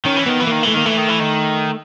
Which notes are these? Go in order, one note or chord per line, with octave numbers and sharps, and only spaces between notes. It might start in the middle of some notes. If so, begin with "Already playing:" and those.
D#3 C#4
E3
D#3 B3
E3
D#3 A#3
E3 A3
D#3 A#3
E3 A3
D#3
E3
D#3